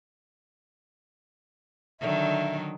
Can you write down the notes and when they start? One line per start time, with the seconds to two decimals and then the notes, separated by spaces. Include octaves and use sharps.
2.01 D3 D#3 F#3 E5